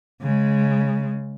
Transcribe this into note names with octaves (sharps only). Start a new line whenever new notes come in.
C#3 G#3